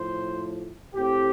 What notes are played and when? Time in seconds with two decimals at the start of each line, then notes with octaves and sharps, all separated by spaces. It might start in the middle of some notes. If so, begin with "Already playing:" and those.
Already playing: A2 F3 A3 C5
0.95 A2 A3 C4 G4